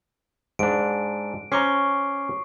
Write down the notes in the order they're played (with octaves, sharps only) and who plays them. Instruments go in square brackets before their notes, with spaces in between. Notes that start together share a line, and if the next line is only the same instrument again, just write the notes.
[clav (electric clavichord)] G#2 D4 [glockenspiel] D7
[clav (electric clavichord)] C#4 C5 A#5 [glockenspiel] C#6 D6 C7